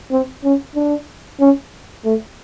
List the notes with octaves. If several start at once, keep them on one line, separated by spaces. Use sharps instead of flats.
C4
C#4
D4
C#4
A3